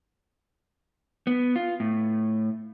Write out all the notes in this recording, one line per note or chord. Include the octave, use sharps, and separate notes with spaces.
B3
F4
A2